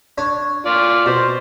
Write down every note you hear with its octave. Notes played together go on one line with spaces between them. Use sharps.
D4 C#5
F4 D5
B2 C5